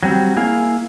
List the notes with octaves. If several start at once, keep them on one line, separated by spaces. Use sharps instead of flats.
F#3 G3 C4
A#3 E4 G#4 F5